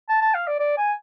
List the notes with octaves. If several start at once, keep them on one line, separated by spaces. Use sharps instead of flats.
A5
A5
F5
D5
D5
G#5